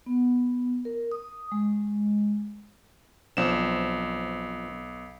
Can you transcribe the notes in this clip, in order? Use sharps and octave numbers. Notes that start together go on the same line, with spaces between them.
B3
A#4
D#6
G#3
B1 F3 C4 D4 E7